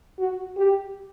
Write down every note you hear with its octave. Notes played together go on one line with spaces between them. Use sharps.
F#4
G4